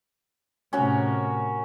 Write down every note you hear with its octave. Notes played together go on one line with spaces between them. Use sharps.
A2 C3 C#4 F#4 A#4